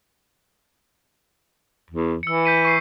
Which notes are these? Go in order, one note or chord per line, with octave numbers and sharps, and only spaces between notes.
E2
E3 E6 C#7
G6 B6 D#7
C#6 C7